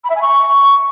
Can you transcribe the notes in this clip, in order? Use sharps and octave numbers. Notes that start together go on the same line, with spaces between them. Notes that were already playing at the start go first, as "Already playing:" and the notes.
B5
E5
G#5
C#6